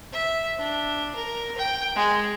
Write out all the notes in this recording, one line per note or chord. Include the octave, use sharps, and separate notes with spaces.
E5
D4
A#4
G5
G#3